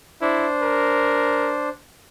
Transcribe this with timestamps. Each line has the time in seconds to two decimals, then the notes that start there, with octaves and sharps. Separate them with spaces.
0.22 D4 E4 C5
0.62 A#4